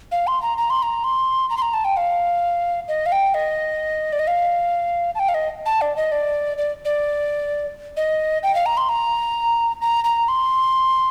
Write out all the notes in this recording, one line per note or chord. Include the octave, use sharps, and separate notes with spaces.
F5
C6
A#5
A#5
C6
A#5
C6
A#5
C6
A#5
A5
G5
F5
D#5
F5
G5
D#5
D5
D#5
F5
A5
G5
F5
D#5
A5
D5
D#5
D5
D5
D5
D#5
G5
F5
A#5
C6
A#5
A#5
A#5
C6